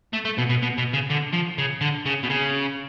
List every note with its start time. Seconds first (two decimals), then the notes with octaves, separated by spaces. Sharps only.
0.13 A3
0.25 A3
0.38 B2
0.49 B2
0.62 B2
0.78 B2
0.94 C#3
1.10 D3
1.33 F3
1.58 C#3
1.81 D3
2.06 C#3
2.23 B2
2.30 C#3